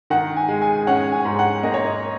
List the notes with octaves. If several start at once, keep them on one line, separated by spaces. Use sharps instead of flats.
D#3 F#5
G#5
G#3
G#5
C#4 F#5
G#5
G#2
F#5
A#3 D#5
C#5
D#5